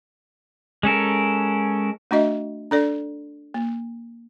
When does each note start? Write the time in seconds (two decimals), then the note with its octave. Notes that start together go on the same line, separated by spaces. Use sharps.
0.83 G#3 C#4 A4 A#4
2.11 A3 D4 F#4 D#5 E5
2.71 D4 A4 D5
3.54 A#3